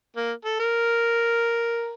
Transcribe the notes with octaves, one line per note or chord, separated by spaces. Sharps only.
A#3
A4
A#4